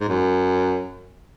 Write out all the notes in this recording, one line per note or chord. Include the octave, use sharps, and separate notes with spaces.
G#2
F#2